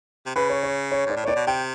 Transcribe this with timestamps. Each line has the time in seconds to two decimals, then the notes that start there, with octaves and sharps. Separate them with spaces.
0.26 C3
0.36 C#3 B4
0.50 C#5
0.63 C#5
0.92 C#5
1.06 G#2 D5
1.16 A2
1.24 A#2 C#5 D5
1.36 B2
1.47 C3 G5